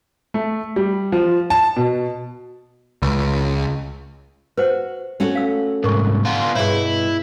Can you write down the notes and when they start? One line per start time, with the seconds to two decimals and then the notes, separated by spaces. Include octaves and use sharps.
0.34 A3
0.76 G3
1.12 F3
1.50 A5
1.76 B2
3.02 C#2
4.57 F#4 B4 C5 F#5
5.20 A3 C#4 F#4
5.35 F5 E6
5.84 C2 G#2 A#4 C#6
6.25 B3 F4 C6
6.55 G2 B2 E4 G#4 C#5